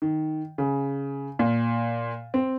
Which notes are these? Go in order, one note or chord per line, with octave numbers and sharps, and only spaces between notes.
D#3
C#3
A#2
C4